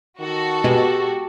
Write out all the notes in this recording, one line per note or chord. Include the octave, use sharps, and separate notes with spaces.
D#3 F#4 A4
B2 G#3 G4